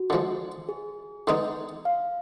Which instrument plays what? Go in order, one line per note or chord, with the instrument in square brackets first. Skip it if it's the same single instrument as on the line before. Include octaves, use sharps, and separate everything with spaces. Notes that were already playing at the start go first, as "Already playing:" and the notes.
Already playing: [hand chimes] F#4
[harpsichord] D3 F3 G#3
[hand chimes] G#4
[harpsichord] D3 G#3 B3 D#4
[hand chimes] F5